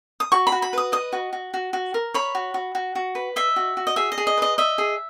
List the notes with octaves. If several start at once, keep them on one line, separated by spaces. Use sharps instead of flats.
D#6
F#4 C#6
B5
F#4
B5
B4 D#6
D#5 D#6
F#4
F#4
F#4
F#4
A#4
C#5 B5
F#4
F#4
F#4
F#4
B4
D#5 E5
F#4
F#4
D#5
G#4 E5
D#5
G#4
D#5
B4 D#5
D#5 E5
G#4